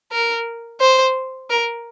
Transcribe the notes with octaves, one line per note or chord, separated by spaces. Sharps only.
A#4
C5
A#4